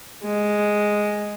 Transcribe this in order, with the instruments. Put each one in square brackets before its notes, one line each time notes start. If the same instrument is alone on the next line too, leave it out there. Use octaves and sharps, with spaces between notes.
[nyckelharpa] G#3